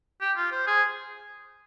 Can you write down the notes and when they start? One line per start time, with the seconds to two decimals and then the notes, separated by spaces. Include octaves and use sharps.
0.21 G4
0.36 F4
0.51 C5
0.67 G#4